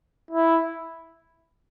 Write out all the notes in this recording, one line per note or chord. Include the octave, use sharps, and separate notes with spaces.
E4